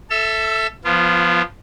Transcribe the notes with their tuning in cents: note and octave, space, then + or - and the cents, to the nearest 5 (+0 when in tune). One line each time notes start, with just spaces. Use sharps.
A4 +0 E5 +0 E6 +35
F3 +0 B3 +0 F4 -30